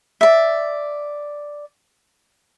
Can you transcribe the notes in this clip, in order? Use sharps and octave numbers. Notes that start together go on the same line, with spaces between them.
D5 E5